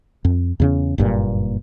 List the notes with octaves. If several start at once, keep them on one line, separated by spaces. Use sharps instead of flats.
F2
E2 C#3 C#4
F#1 G2 A#2